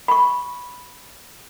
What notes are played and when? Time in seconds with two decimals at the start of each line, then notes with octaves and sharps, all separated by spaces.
0.08 B5 C#6